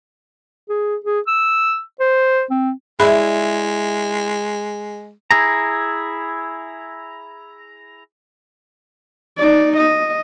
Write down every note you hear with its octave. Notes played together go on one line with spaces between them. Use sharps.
G#4
G#4
E6
C5
C4
G#3 E4 G#4 D5 B5
E4 G#4 A#5
D#4 D5
D#5